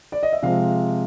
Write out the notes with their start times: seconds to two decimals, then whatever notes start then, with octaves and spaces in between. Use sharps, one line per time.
0.12 D5
0.23 D#5
0.33 E5
0.43 C3 F3 G#3 F5